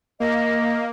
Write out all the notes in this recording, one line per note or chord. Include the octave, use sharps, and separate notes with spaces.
A#3 D#5